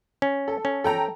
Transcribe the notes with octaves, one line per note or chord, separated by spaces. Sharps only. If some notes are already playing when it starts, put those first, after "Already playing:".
C#4
A4
C#4
A4 G5 A#5